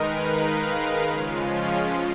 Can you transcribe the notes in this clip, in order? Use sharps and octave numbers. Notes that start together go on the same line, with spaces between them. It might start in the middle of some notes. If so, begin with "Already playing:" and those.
Already playing: D#3 G#3 D#4 A#4 B4
F5
C#3 F3 G#3 C#4 F4